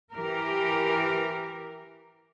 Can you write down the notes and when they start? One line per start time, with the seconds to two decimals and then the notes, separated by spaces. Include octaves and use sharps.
0.12 E3 G4 A#4